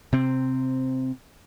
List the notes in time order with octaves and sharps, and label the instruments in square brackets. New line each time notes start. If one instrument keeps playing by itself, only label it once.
[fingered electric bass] C3 C4